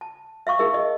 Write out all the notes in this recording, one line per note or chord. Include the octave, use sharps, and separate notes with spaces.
A5
E5 F5 C#6 D6
D#4 G#4 A#4 E5
D#5